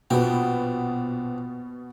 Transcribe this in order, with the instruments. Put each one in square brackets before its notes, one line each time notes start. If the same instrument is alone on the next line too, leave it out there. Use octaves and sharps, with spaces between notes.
[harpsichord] A#1 F#4 G5 [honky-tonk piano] B2 B3